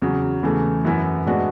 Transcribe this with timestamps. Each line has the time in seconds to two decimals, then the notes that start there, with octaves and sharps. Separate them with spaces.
0.02 E2 C#3 F#3
0.43 E2 C#3 E3 A3
0.85 F#2 E3 B3 E4
1.26 A2 G#3 B3 D4 F#4